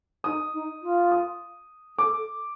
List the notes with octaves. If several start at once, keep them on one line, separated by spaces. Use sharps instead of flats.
D#4 D#6
D#4
F4
D#6
A4 D6